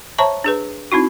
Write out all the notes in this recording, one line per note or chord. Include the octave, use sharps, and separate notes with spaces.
C5 C#5 E5 A5 A#5 C#6
D4 G#4 B4
C4 D#4 E4 F#4